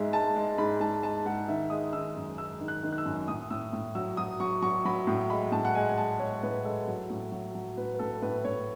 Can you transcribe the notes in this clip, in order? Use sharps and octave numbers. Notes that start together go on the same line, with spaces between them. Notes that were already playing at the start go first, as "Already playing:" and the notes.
Already playing: G#2 G#3 E5
G#3 A5
G#3
G#2 B5
G#2 A5
G#3 A5
G#2 F#5
D#3 E5
G#3 D#6
D#3 E6
F#2
G#3 E6
D#3
F#6
D#3
F#6
E6
F#2
A2 D#6
A2 E6
A2
F#3 E6
F#3 D#6
F#3 C#6
F#3 C#6
F#3 B5
A2
G#3 B5
A2 A5
F#5
G#3 G#5
G#5
G#3 A5
G#3 C#5
A2 B4
G#3 A4
F#3
A2
F#3
F#3
A2 B4
B4
A2 A4
A2 B4
A2 C#5